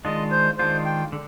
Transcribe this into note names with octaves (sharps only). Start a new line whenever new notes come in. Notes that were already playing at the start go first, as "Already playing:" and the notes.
D#3 G#3 D4 F4 D#5
C5
D#3 G#3 D4 F4 C5
G5
D3